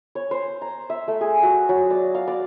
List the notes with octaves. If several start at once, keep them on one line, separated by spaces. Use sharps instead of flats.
C#5
C5
A#5
E5
A3
G#4
F#4
F#3
D5
F5
D5